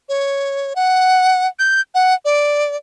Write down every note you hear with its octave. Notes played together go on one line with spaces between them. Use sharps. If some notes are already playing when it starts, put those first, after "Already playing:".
C#5
F#5
G6
F#5
D5